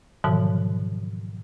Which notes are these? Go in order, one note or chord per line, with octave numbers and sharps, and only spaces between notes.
G#2 B2 D3 D#3 F3 F#3